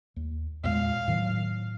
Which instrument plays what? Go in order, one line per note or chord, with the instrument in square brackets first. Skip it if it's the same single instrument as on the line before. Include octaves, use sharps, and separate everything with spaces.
[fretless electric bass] D#2
[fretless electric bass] E2 A#2 G#3 [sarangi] F5
[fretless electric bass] A2 D#3 F#3